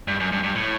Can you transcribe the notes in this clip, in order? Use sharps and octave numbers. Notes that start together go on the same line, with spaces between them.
G2
F#2
G2
G2
A2